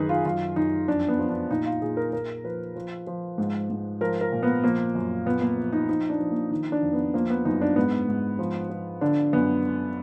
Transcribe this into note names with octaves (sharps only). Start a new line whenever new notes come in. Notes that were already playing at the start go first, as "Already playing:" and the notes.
Already playing: F#2 D#3 D#4 G#4 B4
F4
F#2 F4
F#2 D#4
F2 D4
B3
F3
D4
A#2 D#4
F4
A#2 G#4
A#4
A#2 A#4
F3 B4
F3
F3
G#2
G#2
F3 A#4
A#4
A#2
B3
F3 A#3
F#2
A#2 B3
A#3
F3
D#4
F3 D#4
D4
F3
A#3
D#3 D#4
D4
F2
B3
F3 A#3
B3
F#2 D#4
D4
G#2 B3
G#2
F3
F3
D3 D4
F#2 B3